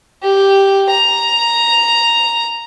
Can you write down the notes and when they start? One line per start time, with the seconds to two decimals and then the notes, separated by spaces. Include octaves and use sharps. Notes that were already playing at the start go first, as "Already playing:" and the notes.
0.23 G4
0.90 A#5